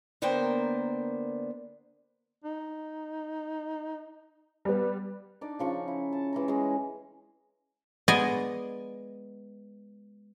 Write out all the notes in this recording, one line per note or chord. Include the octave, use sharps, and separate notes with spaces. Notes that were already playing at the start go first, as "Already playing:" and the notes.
D3 A#3 B3 A#4 C5 G5
D#4
G3 B3
D4 D#4 D5
C#3 F3 C#6
E4
A5
E3 G#3 A#5
G#3 C#4 G#4
G#3 B3 D5 D#5 G#5